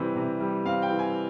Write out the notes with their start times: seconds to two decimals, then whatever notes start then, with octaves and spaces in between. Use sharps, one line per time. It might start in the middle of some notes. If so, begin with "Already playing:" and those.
Already playing: C3 E3 G3 C4
0.15 C3
0.40 G3
0.65 C4 F5
0.82 G5
0.91 E3
0.99 G#5